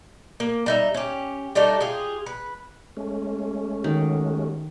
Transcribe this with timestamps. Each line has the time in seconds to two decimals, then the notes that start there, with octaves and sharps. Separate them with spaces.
0.40 A#3
0.66 G3 D#4 E5
0.94 C#4 G4
1.55 G3 A3 D4 D#4
1.80 F4 G4 G#4
2.26 B4
2.97 G#3 A3 C#4
3.84 D#3 F#4 G4